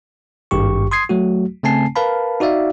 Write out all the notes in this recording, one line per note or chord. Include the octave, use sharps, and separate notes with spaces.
G#1 G2 G4 C#6
C6 D#6 G#6 C7
F#3 A3 F#4
C#3 A3 C4 G#5 A5 C7
A#4 B4 F5 A5 B5
D#4 F#4 D5 E5 F5